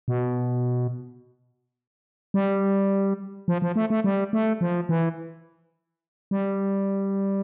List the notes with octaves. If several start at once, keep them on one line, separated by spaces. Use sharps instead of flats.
B2
G3
F3
F3
A3
A3
G3
A3
F3
E3
G3